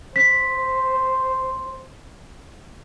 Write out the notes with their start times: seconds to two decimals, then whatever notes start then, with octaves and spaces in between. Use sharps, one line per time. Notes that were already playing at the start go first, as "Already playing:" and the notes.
0.16 C5 B6